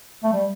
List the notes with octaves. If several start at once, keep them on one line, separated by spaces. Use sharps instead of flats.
A3
G3